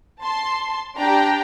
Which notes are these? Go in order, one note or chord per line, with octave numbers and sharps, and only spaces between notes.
A5 C6
D4 G4 G5 A#5